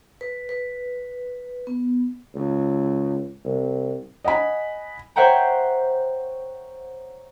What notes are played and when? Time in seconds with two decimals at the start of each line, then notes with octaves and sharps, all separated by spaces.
0.21 B4
0.49 B4
1.67 B3
2.35 C#2
3.45 C2
4.24 D#5 F#5 G#5 B5
5.16 C5 C#5 E5 F#5 G5 A#5